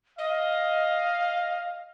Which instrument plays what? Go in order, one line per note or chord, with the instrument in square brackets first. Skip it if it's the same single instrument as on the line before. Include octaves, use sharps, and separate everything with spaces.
[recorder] D#5 [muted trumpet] F5